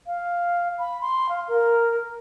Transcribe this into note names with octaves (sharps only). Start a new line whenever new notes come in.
F5
B5
C6
F5
A#4